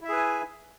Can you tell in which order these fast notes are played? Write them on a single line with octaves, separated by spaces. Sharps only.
E4 E5 G#4 B4 G#5